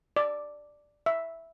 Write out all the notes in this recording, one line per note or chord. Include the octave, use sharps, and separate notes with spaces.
D5
E5